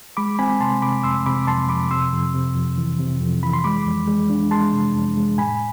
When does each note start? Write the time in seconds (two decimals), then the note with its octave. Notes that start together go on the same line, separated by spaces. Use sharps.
0.17 G#3 B5 D6
0.39 C4 G#5 B5
0.60 C3 A5 C6
0.82 C3 B5 D6
1.04 F2 C6 E6
1.26 C3 B5 D6
1.47 F2 A5 C6
1.69 F2 B5 D6
1.91 C3 C6 E6
2.13 F2
2.35 C3
2.56 F2
2.78 E3
2.99 C3
3.21 F2
3.43 E3 B5
3.53 C6
3.64 G#3 B5 D6
3.86 F2
4.08 G#3
4.30 D4
4.51 G#3 A5 C6
4.73 C3
4.95 F2
5.17 G#3
5.38 A2 G#5 B5